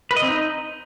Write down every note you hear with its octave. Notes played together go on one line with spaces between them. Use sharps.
B4
D#5
C4
D#4